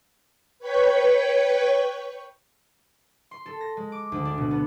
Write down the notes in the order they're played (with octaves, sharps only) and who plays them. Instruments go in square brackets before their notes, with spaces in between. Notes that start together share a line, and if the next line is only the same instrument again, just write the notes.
[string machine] B4 C#5 G5 C#6 B6
[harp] C6
A4
A#6
G#3
D6
D2
D4
B2
B3